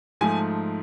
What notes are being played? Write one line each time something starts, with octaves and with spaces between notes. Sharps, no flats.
G#2 F3 A3 G#5